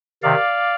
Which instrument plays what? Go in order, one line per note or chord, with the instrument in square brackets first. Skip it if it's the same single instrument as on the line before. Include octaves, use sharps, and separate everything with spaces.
[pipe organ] C3 D#3 D5 F5